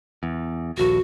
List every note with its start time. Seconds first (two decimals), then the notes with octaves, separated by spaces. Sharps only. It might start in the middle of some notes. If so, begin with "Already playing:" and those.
0.23 E2
0.77 D#1 A#1 F#4